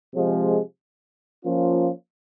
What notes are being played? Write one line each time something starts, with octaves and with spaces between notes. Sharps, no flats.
C3 F3 G#3
F3 A#3 C#4 F4